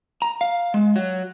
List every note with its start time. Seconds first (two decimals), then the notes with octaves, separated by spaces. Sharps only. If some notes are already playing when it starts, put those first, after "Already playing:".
0.22 A#5
0.41 F5
0.74 G#3
0.96 F#3